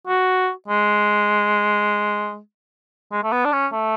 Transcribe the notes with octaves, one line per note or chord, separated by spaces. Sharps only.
F#4
G#3
G#3
A3
B3
D4
C#4
A3